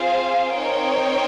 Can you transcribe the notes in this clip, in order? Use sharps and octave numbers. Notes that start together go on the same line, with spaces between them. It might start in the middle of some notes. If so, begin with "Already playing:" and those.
Already playing: C4 F4 G#4 C5 F5
C4 D#4 A#4 C#5 G5